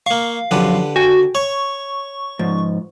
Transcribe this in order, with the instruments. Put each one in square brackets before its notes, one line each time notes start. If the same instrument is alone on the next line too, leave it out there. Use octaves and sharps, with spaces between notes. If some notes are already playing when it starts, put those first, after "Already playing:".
[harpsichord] A#3 C#6 [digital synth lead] F5
[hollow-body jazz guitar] F#2 F3 F#3 [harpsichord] D3 G4 B4
[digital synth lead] F#4 [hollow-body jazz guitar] G5 G#5
[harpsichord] C#5 [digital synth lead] C#6
[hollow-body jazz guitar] G#2 F3